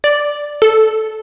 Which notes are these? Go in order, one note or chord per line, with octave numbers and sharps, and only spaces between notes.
D5
A4